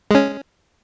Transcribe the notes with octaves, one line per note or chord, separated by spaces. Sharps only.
G#3 C#4